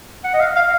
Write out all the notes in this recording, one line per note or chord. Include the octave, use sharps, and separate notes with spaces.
F#5
D#5
F5
F5